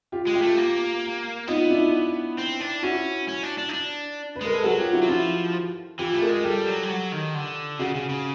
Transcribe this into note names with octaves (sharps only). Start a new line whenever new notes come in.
F4 G4
G#3
F4 G4
A3
A#3
B3 D#4 F4
D4 E4
C4
D4
C#4 E4 F#4
C#4
D4
D4
D#4
D4
B4
G#3 A#4
A4
F#3 F#4 G#4
F4 G4
E4 F#4
F#3
F3 E4 F#4
E3 F4 G4
A3
G#4 A#4
G#3
G3 G4 A4
F#3
G3
F#3
D#3
D3
C#3 F#4 G#4
C#3
C#3